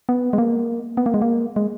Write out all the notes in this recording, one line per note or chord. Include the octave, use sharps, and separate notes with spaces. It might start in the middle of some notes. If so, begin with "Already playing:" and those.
B3
G#3
A#3
B3
A#3
G#3
A#3
G#3